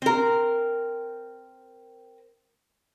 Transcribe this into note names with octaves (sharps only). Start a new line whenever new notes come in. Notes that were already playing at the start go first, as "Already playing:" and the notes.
C4 A#4